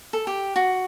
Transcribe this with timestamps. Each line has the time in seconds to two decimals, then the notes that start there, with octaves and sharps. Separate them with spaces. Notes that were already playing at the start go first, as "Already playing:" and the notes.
0.13 A4
0.27 G4
0.56 F#4